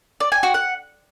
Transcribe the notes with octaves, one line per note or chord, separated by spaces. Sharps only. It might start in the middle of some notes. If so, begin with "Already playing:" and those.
D5
G#5
F#4
F#5